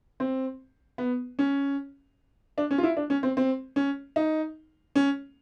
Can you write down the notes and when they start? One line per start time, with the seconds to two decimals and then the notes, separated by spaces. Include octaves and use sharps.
0.20 C4
0.98 B3
1.39 C#4
2.58 D4
2.71 C#4
2.78 F4
2.83 E4
2.97 D4
3.10 C#4
3.23 C4
3.37 C4
3.76 C#4
4.16 D#4
4.96 C#4